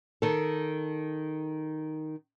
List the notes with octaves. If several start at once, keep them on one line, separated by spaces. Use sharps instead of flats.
D#3 A4